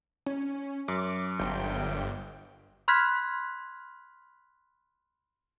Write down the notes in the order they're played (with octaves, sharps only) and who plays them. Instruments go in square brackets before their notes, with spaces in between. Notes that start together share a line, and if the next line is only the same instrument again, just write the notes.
[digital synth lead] C#4
[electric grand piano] F#2 [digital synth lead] D6
[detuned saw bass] G1 [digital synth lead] G5
[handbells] B5 C6 F6 F#6 G#6 B6